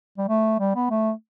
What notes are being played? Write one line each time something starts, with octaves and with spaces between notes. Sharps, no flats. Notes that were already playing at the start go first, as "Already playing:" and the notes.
G3
A3
G3
B3
A3